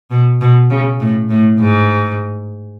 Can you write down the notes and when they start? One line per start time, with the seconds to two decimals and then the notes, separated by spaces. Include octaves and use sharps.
0.11 B2
0.41 B2
0.70 C#3
1.00 A2
1.30 A2
1.60 G#2